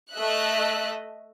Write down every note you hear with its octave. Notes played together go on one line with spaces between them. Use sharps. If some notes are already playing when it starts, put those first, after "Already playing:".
A3 D#5 E5 F#6